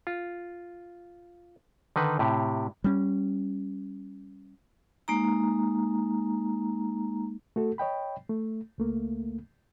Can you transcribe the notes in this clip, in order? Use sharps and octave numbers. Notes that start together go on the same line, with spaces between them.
F4
D3 D#3 D#4 B4
A2 C3 G4
G3 C#4
G#3 A#3 D#4 A#5
A3 F#4 A4
C#5 D#5 G5 B5
A3
C#2 A3 A#3